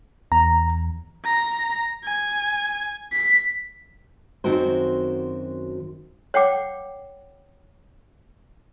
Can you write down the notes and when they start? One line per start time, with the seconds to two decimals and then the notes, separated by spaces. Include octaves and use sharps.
0.32 E2 A#5
1.25 A#5
2.05 G#5
3.13 B6
4.44 F#2 D#3 C4 F#4 A#4 C5
6.34 C#5 F#5 G5 D6